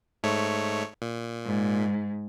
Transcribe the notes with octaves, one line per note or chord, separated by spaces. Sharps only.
G#2 A3 C#5
A#2
G#2